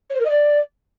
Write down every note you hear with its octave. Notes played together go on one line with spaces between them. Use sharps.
C#5
C5
A#4
D#5
D5